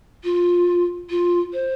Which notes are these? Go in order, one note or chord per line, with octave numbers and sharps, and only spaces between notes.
F4
F4
C5